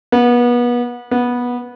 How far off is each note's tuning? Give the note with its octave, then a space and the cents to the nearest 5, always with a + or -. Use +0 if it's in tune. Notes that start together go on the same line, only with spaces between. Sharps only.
B3 -30
B3 -15